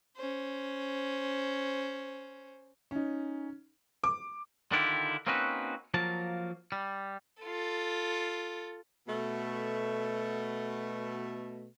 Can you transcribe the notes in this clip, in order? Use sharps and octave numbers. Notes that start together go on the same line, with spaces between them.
C#4 C5
C#4 D#4
D6
D3 D#3 D4 E4 F4 G4
A#3 C4 C#4 D#4 F#4 B4
F3 F#3 A#3 A5
G3
F4 A4
B2 A3